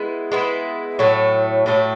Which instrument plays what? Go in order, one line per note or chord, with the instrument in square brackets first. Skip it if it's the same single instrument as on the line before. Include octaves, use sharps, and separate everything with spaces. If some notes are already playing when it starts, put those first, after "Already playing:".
Already playing: [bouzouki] G#3 B3 E4
G#3 B3 E4
A2 F#3 A3
A2 F#3 A3